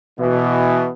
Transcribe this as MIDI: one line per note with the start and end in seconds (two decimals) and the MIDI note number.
0.19 0.90 47
0.19 0.90 52